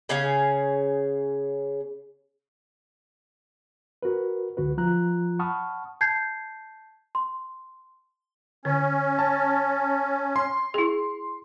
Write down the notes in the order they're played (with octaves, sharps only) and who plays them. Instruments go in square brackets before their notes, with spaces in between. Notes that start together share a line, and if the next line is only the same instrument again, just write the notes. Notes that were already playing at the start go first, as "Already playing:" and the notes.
[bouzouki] C#3 C#4 G#4 F5
[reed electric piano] F#4 A#4 B4
C#2 D3 F#4 B4
F3 F4 A#5 F#6
F#5 A5 B5 C#6 D#6 F6
[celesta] A5 G6 G#6 C7
C6
[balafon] D3 [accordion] C#4
[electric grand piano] A5
C6
[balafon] E4 G#4